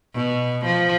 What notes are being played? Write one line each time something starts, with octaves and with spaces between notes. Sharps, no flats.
B2
F3